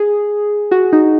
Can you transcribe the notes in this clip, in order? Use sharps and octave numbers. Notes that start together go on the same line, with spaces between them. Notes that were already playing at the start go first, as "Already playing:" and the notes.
Already playing: G#4
F#4
D#4